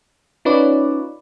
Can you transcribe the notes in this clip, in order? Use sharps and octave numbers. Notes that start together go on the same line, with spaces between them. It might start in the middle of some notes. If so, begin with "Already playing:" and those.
C#4 D#4 F4 B4 C#5 D5